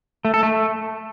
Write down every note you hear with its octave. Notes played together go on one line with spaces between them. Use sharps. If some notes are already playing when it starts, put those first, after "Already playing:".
A3
A4
A3